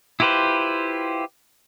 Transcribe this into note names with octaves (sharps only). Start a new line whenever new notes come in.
E4 F4 G4 B4 C5